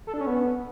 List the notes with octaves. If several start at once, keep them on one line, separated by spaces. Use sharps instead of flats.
A4
D4
C#4
B3